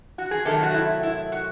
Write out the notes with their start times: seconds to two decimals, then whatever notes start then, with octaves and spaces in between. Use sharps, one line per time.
0.18 F#4
0.31 G#4
0.45 C3 D#3 F#3 A3 A4
0.63 F#4
0.74 E4
1.03 E4
1.32 F#4